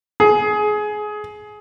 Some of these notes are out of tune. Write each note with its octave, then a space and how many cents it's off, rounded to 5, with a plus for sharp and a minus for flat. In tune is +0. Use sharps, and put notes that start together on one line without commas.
G#4 +20